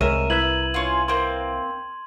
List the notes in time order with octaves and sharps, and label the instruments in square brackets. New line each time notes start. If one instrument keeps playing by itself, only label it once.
[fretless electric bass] C2 [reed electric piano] G#3 C#5 E5 [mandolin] A#4 [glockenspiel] D#7 E7
[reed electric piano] E4 B4 E5 [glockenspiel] G#6 F#7
[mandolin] C#4 F4
[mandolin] A#3 C4 [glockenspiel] C6